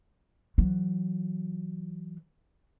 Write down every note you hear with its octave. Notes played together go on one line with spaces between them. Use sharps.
E3 F#3